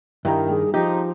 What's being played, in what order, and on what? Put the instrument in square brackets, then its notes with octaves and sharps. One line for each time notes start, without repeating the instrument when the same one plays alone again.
[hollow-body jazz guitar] G2 [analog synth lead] D#3 [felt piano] E4 G5 A#5
[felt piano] G3 [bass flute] G#4
[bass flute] F3 [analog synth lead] D#4 [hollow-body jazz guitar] G4 [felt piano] G5